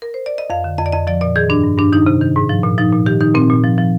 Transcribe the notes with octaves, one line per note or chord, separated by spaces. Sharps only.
A#4
C5
D5
D#5
F2 F5
D3
F2 D#5
D5
F2 D#5
F3 D5
A#2 D5
D#3 G#4
G2 D4
G2
G2 D4
D#3 D#4
C3
D#3
G#2
F3
A#2
F3 D#4
A#2
D#3 G4
D#3 D#4
A#2 C4
A#2
F3
F3